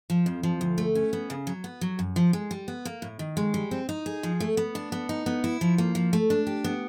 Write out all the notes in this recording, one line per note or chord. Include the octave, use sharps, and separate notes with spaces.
F3
F2
F3
D2
A3
C#4
B3
C#3
F#3
B3
F#3
F#2
F3
G#3
G3
B3
A#3
A2
D#3
G#3
G3
C4
D#4
G#4
F3
A3
B3
D4
B3
D#4
B3
E4
F3
A#3
F3
A3
D4
G4
B3